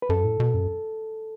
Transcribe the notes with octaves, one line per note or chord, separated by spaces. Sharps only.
B4
F#2 A4
A2
B2
F#2